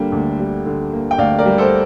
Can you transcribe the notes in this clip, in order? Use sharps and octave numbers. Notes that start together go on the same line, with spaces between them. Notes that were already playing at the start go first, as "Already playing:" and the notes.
Already playing: D3 G3 A#3
D2
G3
D3
A#3
G5
D2 D5 F5
A#4 D5
G3
A4 C5